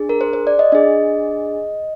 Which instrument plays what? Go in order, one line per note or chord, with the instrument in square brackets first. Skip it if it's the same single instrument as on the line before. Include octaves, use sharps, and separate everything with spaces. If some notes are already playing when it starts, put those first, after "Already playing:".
Already playing: [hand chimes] D4 G#4
A#4
C5
C5
D5
D#5
D4 G#4 D#5